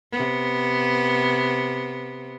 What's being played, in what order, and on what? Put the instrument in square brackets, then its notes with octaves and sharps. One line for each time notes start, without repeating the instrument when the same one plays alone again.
[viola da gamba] C3 B3